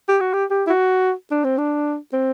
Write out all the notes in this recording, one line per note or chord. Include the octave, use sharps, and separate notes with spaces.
G4
F#4
G4
G4
E4
F#4
D4
C4
D4
C4